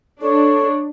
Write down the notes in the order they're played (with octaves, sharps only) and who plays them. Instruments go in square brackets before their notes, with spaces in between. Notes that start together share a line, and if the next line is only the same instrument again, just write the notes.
[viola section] D4 [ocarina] A4 [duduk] C#5